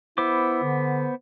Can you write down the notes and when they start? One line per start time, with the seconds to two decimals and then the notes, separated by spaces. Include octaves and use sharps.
0.18 B3 E4 C5 D6
0.63 D3